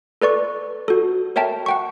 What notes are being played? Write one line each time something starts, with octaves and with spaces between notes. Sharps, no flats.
A4 B4 D5 C#6
F#4 A4
A#4 C#5 E5 G5 A5
F#5 G5 C#6